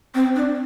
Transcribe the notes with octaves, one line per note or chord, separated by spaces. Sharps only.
C4
D4